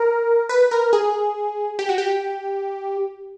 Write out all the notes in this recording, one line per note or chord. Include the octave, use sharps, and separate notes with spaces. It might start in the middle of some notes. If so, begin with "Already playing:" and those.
Already playing: A#4
B4
A#4
G#4
G4
F#4
G4